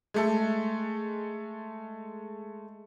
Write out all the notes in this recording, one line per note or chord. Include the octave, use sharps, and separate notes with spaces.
G#3 A3 A4